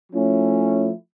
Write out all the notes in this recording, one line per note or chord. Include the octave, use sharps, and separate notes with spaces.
F3 A3 C#4 E4